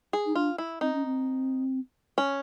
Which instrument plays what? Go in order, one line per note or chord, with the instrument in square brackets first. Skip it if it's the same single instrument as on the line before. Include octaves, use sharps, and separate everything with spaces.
[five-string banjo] G#4
[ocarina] D#4
[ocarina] D4 [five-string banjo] F4
[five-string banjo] E4
[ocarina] C4 [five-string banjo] D#4
[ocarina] C#4
C4
[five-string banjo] C#4